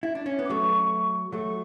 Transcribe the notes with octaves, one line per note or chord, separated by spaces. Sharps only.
E4
D4
C#4
B3
D6
F#3 A3 C#6
F#3 A3 C#6